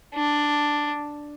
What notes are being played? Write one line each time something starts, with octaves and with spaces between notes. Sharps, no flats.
D4